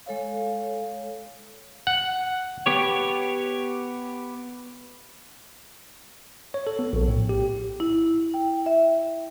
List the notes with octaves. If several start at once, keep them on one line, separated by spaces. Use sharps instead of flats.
G#3 A4 C#5 F5
F#5
B3 G4 C#5
C#5
A4
B3
A#1
A2
G4
E4
G5
E5